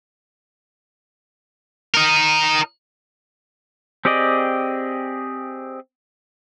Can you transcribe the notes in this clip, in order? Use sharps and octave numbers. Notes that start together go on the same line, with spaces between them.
D#4 A#4
C4 G4 G#4 D5 D#5